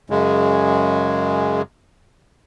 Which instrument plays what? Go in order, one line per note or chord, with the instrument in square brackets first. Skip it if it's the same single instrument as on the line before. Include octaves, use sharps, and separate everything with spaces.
[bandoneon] F#2 C#3 G#3